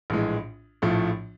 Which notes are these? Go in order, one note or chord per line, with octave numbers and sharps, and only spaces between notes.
A#1 A2 E3 G#3
A#1 A2 F3 A3